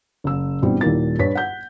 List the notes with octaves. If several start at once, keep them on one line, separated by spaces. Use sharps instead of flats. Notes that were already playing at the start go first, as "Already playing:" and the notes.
F#1 E6
G2 B2 E3 G3 C4
D#1 A#2 D#3 A#3 E4 A6
G2 B4 C#5 B6
F#5 G6